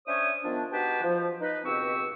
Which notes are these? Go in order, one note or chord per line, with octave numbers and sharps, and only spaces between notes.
C#4 D4 C5 C#5 E5 D#6
D#3 F3 B3 D4
D#4 F#4 G4 B4 G5 A5
F3
D#4 B4
C#2 B2 C4 G4 C#6 E6